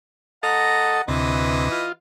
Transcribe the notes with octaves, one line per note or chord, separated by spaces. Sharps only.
A4 D#5 F#5 A#5
D2 C3 E3 B4 D#5
F4